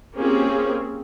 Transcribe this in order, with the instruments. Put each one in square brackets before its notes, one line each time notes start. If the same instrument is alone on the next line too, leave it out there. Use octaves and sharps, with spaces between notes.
[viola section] A#3 C4 C#4 F4 G4 G#4